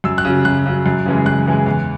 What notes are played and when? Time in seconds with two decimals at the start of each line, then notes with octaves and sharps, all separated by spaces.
0.04 F#2 E6
0.18 F#6
0.25 C#3 F#3
0.45 F#2 F#6
0.66 C#3 F#3
0.86 F#2
1.06 C#3 E3 G#3
1.26 F#2 F#6
1.46 C#3 E3 G#3
1.66 E2